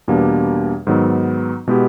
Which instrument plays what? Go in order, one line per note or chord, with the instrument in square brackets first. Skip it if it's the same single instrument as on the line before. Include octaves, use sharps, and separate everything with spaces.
[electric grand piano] E2 B2 G3 A#3 D4
G#2 D#3 F#3 B3
B2 G#3 B3 E4 G4